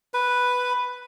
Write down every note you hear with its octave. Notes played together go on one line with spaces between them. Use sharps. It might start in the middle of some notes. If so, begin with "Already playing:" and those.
B4